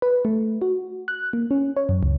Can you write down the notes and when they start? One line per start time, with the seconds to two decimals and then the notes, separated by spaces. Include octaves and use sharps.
0.02 B4
0.25 A3
0.62 F#4
1.08 F#6
1.33 A#3
1.51 C#4
1.77 C#5
1.89 F#2
2.03 C#2